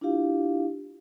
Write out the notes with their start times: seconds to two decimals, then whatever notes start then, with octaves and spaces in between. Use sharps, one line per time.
0.01 D4 E4 F4 G4 F5